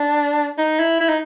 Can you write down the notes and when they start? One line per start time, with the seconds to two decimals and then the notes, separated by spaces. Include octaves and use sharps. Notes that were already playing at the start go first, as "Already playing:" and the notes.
Already playing: D4
0.59 D#4
0.80 E4
1.01 E4
1.09 D#4